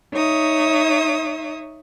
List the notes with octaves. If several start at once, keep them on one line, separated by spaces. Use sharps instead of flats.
D#4 C#5 E5 D#6